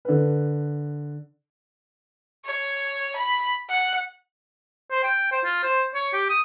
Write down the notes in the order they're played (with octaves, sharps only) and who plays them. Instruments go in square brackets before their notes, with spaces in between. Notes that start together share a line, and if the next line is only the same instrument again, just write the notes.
[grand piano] D3 B4
[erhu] C#5
B5
F#5
[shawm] C5
G5
C5
F4
C5
C#5
G4
D#6